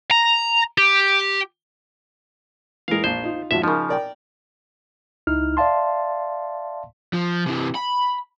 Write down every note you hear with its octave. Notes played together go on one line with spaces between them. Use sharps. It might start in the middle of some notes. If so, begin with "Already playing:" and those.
A#5
G4
E3 G#3 A#4 F5
A#1 C5
D#4 F4
G#1 F3 F#4 E5
C#3 F3 D#4 A#4
A#4 D5 G5
C#2 D#4 E4 F6
D5 E5 F5 A5 C6
F3
C3 E3
B5